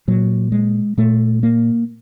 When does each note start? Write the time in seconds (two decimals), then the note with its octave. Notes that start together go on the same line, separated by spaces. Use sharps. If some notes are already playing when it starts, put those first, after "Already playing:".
0.08 A#2 F#3
0.52 G#3
0.98 A#2 A3
1.43 A#3